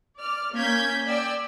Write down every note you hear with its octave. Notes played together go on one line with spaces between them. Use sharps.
D5 F6
A#3 C#4 G6 G#6 B6
D5 G5 E6